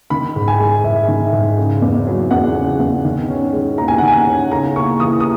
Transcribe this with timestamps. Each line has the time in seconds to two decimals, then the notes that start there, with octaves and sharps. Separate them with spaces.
0.10 D#3 B5
0.36 G#2
0.48 G#5
0.60 G#3
0.84 G#2 E5
1.08 D#3
1.33 G#2
1.58 C#3
1.82 E2
2.07 F#3
2.31 E2 F#5
2.55 C#3
2.80 E2
3.05 D#3
3.29 C#4
3.53 G#3
3.78 D#2 A#5
3.88 G#5
3.98 D#3 F#5
4.08 G#5
4.27 C#4
4.51 C#3 A#5
4.76 A#3 C#6
4.99 E3 D#6
5.20 D#6